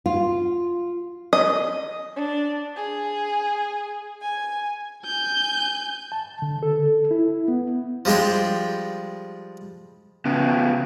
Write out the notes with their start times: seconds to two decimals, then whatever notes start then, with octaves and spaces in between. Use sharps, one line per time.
0.06 F4
1.33 D#5
2.15 D4
2.76 G#4
4.21 G#5
5.03 G#5 G6
6.12 A5
6.42 D3
6.63 A4
7.11 E4
7.48 B3
8.05 F3 G3 G#3 D4 G4
10.25 C#3 B3